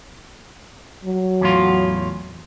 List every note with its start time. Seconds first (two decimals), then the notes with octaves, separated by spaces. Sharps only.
1.05 F#3
1.41 E2 A2 F4